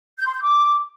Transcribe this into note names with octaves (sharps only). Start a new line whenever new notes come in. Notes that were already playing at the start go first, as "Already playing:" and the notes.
G6
C6
G6
D6